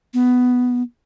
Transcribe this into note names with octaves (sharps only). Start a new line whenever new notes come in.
B3